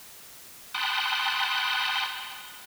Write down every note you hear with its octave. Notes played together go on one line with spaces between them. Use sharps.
G5 A5 B5 C6 D#6 F#6